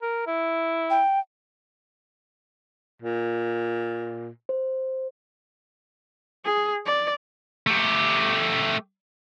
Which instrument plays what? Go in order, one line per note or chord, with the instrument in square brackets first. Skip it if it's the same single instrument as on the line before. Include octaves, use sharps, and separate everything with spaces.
[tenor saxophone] A#4
E4
[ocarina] G5
[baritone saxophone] A#2
[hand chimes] C5
[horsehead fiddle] G#4
D5
[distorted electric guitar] A3 G4